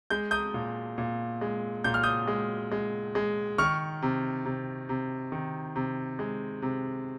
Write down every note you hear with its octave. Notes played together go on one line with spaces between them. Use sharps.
G#3 G6
D#6 G6
A#2
A#2
G#3
A#2 G6
F6
D#6 G6
G#3
G#3
G#3
D#3 C#6 F6
C3
C3
C3
D#3
C3
G#3
C3